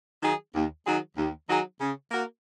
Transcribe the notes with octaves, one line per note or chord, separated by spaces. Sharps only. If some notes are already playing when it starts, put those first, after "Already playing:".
D#3 F#3 D#4 G#4
D#2
D#3 F#3 D#4 G#4
D#2
D#3 F#3 D#4 G#4
C#3
A#3 F#4 A#4